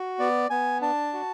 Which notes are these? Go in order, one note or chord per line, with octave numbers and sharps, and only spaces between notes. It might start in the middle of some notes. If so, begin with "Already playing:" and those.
Already playing: F#4
B3 D5
B3 G#5
D4 A5
F#4